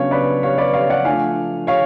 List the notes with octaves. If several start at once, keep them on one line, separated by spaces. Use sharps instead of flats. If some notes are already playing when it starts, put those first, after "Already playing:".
Already playing: C#3 F#3 B3 D4 C#5 F5
B4 D5
C#5 F5
B4 D5
C#5 F5
D5 F#5
F3 A3 D4 F5 G#5
C#5 F5